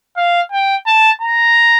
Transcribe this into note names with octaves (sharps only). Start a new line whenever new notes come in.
F5
G5
A5
A#5